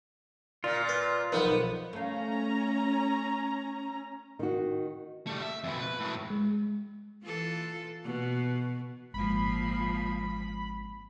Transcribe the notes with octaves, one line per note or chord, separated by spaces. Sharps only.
A#2 F4
B4
B1 F2 D#3 B3
A3 C#4 F5 A#5
D#3 F#4
G3 A3
E5
F2 B2
B4
A2 F#3
G#3
E3 F4 A4
B2
G#1 A#2 F3 G#3 B5